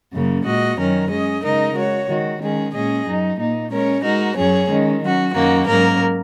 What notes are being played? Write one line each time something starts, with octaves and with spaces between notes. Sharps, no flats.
F#2 C#3 A#3
A#2 G#3 F#4 D#5
F#2 D#3 F#3 C#4 A#4
G#3 C#4 G#4 D#5
C#3 G#3 D#4 A#4 D#5
G#3 F#4 C#5
D#3 G#3 F#4
D#3 G#3 C#4 G#4
A#2 G#3 C#4 G#4 D#5
F#2 F#3 D#4
A#2 A#3 D#4
G#3 C#4 A#4 C#5
G#3 D#4 F#4 A#4
F#2 F#3 C#4 G#4 C#5
D#3 G#3 C#4
F#3 C#4 F#4
F#2 D#3 A#3 C#4 F#4
G#2 F#3 A#3 C#4 A#4